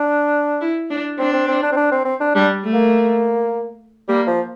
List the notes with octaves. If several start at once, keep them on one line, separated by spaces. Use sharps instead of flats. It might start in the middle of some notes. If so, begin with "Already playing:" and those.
Already playing: D4
E4
D4
C4 D4
C4
C4
D4
C4
D4
C4
C4
D4
G3 D4
A3
A#3
G3 A#3
F3